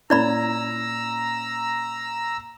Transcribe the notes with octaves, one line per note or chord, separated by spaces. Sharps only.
A#2 C#4 E4 D5 A#5 B5 E6